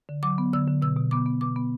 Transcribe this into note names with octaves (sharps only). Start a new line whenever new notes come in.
D3
F#3 D6
B3
D3 E6
D3
B2 E6
B2
B3 D6
B3
B2 D6
B3